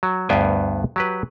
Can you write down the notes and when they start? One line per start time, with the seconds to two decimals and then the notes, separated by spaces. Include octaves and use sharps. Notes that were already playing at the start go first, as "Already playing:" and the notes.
0.03 F#3
0.29 D2 G2 B3 C5 G5 G#5
0.96 F#3 G4 B4